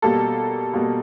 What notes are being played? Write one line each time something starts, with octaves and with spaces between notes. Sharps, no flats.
B2 G3 A#3 A4
B2 G3 A#3